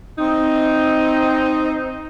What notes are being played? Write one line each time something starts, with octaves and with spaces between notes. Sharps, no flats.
C4 D#4